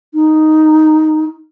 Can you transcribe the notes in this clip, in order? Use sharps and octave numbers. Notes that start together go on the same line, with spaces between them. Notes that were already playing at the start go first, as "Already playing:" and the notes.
D#4